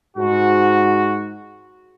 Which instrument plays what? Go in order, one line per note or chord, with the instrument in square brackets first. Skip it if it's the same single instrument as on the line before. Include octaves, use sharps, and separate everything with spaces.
[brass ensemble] G#2 F#4